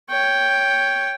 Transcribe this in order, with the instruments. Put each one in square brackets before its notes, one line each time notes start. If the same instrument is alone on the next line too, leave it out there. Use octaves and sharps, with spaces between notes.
[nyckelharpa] C#5 G5